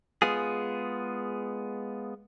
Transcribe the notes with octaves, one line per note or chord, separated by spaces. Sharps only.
G#3 B3 F4 G#4